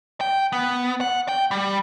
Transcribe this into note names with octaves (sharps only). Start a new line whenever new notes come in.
G5
B3
F#5
G5
G3